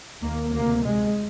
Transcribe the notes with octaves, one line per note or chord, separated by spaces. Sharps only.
D#2 A#3
D2 C3 A#3
F2 C3 G#3